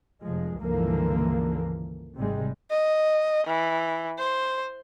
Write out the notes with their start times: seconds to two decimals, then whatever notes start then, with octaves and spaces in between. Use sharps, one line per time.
0.22 F1 F3 G#3
0.62 C#2 G2 D3 E3 F3 A#3
2.18 G#1 C3 G3 G#3
2.70 D#5
3.46 E3
4.18 C5